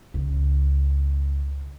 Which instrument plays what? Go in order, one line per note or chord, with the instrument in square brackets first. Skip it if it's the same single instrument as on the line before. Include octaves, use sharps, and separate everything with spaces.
[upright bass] C#2 C#3